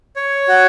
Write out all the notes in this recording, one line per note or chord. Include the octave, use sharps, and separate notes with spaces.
C#5
F#4